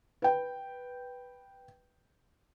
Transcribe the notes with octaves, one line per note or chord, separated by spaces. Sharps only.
B4 G5